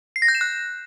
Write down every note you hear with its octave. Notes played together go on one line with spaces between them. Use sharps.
C7
A#6
G6
E7
F#6